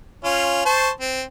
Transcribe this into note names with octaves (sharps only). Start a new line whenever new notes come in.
C#4 F4
C5 A5 C#6
C4